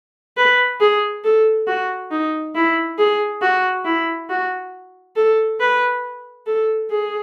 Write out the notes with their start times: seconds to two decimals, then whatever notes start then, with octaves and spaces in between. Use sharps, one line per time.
0.37 B4
0.80 G#4
1.24 A4
1.68 F#4
2.11 D#4
2.55 E4
2.98 G#4
3.42 F#4
3.85 E4
4.30 F#4
5.16 A4
5.60 B4
6.47 A4
6.91 G#4